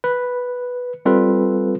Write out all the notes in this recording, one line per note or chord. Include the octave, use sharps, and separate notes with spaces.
B4
G3 C4 F4 A4 B4